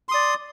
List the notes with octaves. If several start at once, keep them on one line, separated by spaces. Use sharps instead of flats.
D5 C6 D#6